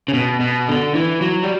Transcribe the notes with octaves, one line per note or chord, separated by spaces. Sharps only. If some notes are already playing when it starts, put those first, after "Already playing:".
C#3
B2
B2
D3
E3
F#3
G3